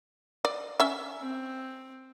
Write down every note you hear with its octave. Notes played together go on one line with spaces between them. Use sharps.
D5
C#4 E5
C4